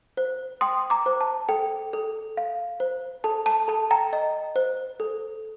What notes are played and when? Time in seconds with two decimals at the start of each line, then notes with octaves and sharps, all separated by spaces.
0.17 C5
0.61 G5 C6 D#6
0.90 A#5 D6
1.06 C5
1.21 A5
1.49 A4 G5
1.93 A4
2.37 F5
2.80 C5
3.24 A4 A5
3.46 A5
3.68 A4 A5
3.91 G5 A#5
4.13 D#5
4.56 C5
5.00 A4